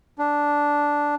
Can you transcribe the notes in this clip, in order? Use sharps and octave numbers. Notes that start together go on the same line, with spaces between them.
D4